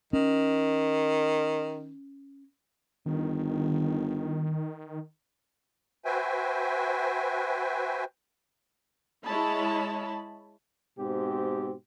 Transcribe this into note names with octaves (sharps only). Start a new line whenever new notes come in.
D#3 C#4
G1 D#3
F#4 B4 C5 E5 G5 G#5
G#3 E4 C#5 D#5 A5 B5
G#2 B2 C4 G4